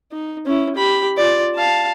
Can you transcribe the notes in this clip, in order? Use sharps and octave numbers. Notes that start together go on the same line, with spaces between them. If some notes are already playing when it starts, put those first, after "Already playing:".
D#4
C#4 E4
G4 B5
F4 D5
F5 A5